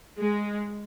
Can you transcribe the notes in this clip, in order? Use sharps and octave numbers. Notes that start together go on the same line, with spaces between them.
G#3